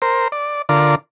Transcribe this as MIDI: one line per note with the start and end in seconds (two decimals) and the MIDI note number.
0.02 0.28 70
0.02 0.28 72
0.32 0.62 74
0.69 0.95 50
0.69 0.95 65
0.69 0.95 70
0.69 0.95 74